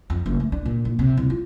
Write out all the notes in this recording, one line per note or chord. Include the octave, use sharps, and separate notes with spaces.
F2
F#1
A3
D4
A#2
A#1
C3
C2
F4